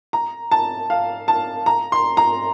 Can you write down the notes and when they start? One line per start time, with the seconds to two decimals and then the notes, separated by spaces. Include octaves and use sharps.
0.13 A#5
0.51 A5
0.90 F5
1.28 A5
1.66 A#5
1.92 C6
2.17 A#5